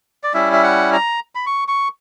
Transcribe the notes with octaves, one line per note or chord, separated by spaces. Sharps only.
D5
G3 C#4 E4 E5
E5
F#5
A#5
B5
C#6
C#6